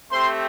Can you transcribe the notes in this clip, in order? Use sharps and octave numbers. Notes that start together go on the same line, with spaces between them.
A3 C4 G4 C5 C6